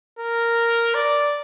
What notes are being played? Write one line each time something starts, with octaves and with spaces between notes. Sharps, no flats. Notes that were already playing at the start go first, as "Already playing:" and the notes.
A#4
D5